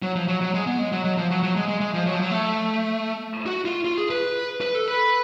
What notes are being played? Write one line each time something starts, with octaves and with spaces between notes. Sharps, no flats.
F#3
F3
F#3
F#3
G#3
B3
G#3
F#3
F#3
F3
F#3
F#3
G#3
G#3
G#3
F3
F#3
F3
F#3
A3
F#4
F4
F4
G#4
B4
B4
A4
B4